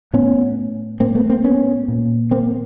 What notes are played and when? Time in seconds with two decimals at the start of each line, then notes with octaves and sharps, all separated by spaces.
0.13 A2 B3 C#4
1.00 A2 A#3 C4
1.15 A3 B3
1.29 A#3 C4
1.44 B3 C#4
1.88 A#2
2.31 A#3 C4